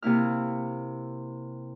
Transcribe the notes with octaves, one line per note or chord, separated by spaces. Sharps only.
C3 A#3 E4 F6